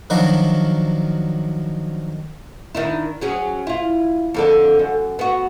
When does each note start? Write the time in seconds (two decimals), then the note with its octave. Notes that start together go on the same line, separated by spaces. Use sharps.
0.10 D#3 F3 F#3 D4 F#4
2.75 D#3 D4 E4
3.21 F#3 C#4 G#4
3.67 E4 F4
4.34 F2 D3 A4
4.79 F#2
5.19 B3 F#4